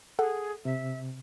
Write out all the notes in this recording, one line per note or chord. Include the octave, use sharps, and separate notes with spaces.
G#4 A4 F#5
C3 E5